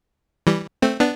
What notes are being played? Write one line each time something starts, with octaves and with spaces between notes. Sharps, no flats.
E3 G3
A3 C4
B3 D4